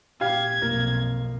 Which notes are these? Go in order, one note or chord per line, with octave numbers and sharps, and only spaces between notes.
A#2 G4 F5 G#6
B1 F2 A#3